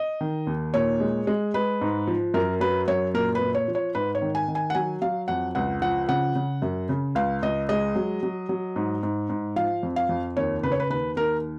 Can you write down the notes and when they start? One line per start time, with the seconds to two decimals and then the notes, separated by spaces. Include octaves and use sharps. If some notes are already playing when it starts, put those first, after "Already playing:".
Already playing: D#5
0.21 D#3
0.47 D#2
0.74 A#2 C#5
1.00 G#3
1.27 G#3
1.54 G#3 B4
1.81 G#2
2.07 F3
2.34 F#2 A#4
2.60 F#3 B4
2.88 F#2 C#5
3.14 A#2 A#4
3.35 B4
3.41 A#2
3.55 C#5
3.68 F3
3.75 C#5
3.95 G#2 B4
4.15 C#5
4.22 D#3
4.35 G#5
4.48 D#3
4.55 G#5
4.70 F#5
4.75 F#3 G#5
5.02 F#3 F5
5.28 F2 F#5
5.55 C#2 F#5
5.82 F3 F#5
6.08 C#3 F#5
6.35 C#3
6.62 F#2
6.89 C#3
7.15 C#2 F5
7.42 C#2 D#5
7.69 G#3 D#5
7.96 F#3
8.23 F#3
8.49 F#3
8.76 G#2
9.03 G#2
9.29 G#2
9.56 F3 F5
9.83 F2
9.96 F5
10.09 F2
10.37 D#2 C#5
10.63 C#3 B4
10.72 C#5
10.80 B4
10.90 D#2 B4
11.16 D#2 A#4